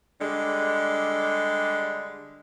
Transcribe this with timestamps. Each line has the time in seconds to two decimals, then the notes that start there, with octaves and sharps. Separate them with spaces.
0.21 D3 G3 G#3